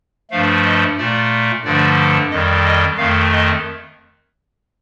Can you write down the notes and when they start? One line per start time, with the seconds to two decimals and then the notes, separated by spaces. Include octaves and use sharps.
0.31 G2 F3 A3 F5
0.65 D#5
0.98 A#2 A3 D5
1.65 G2 D3 F3 A3 D5
2.31 F2 D#3 G3 D#5
2.65 D#5
2.98 F2 D#3 A3 F5
3.32 D#5